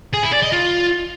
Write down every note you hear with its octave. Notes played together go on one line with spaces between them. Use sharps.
G#4
E4
D5
D#5
F4